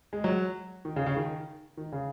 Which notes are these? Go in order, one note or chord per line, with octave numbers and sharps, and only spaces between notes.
G#3
F#3
D#3
C#3
C#3
D#3
D#3
C#3